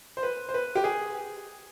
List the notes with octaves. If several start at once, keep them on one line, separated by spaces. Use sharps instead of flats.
C5
B4
C5
B4
G4
G#4